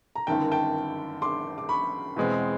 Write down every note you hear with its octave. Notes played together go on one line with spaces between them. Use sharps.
A#5
G1 F#2 D#3 G5 A5
G5 A5
C6 D6
D6
B5 C#6
E2 B2 G#3 C4